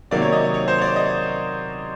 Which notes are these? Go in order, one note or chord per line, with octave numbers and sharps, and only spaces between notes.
C3 D#3 F#3 A#3 D5
C#5
D#5
C#5
C5
C#5
D5
D#5